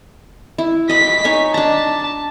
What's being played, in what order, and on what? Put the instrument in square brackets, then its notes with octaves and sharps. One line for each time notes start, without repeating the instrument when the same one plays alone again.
[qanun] E4
[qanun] D#5 B5 [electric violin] B6
[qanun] D#4 C#5 G#5
[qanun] D4 A#5 [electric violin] A5